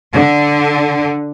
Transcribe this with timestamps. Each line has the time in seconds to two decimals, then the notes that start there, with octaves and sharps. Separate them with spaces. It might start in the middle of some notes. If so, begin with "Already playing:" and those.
0.14 D3